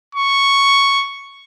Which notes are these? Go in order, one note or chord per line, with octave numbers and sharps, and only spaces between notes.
C#6